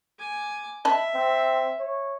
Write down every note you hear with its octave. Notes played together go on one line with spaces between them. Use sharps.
G#5 D6
D#5 E5 A5 B5
C4
C#5